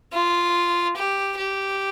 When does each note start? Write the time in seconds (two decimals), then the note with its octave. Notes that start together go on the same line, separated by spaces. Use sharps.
0.13 F4
0.96 G4
1.37 G4